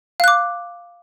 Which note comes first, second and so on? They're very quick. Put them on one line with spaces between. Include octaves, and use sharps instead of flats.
F5 F#6 D6